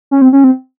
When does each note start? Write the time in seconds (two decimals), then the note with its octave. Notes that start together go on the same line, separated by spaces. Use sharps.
0.11 C#4
0.22 C4
0.33 C#4
0.44 C4